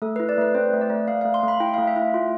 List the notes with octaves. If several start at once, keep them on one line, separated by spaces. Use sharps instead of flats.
A3 A4
E4 B4
D5
A3 B4
C4 C5
A3
D5
A3
A3 F5
A3 F5
C6
A3 B5
E4 G5
A3 F5
E5
E4
F4